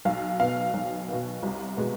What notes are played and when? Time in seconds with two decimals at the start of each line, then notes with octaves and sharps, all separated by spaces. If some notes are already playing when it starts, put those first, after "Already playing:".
0.05 B1 F5
0.39 B2 B3 F5
0.74 B1
1.09 B2 B3
1.43 C2
1.77 B2 G#3 B3